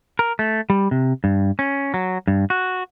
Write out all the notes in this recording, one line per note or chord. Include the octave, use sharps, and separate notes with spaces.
A#4
A3
G3
C3
G2
C#4
F#3
G2
F#4